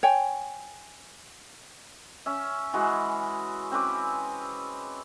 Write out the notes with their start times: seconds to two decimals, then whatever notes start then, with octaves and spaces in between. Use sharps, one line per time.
0.03 C#5 G5 G#5
2.26 C#4 E5
2.73 E3 G#3 F#4
3.72 C4 C#4 B4 D6